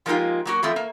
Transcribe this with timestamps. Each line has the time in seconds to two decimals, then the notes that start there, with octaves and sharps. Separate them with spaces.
0.06 F3 G#3 A#3 D#4 F4 G4
0.45 F#3 A#3 F#4
0.63 E3 F3 A3 C4
0.76 A#3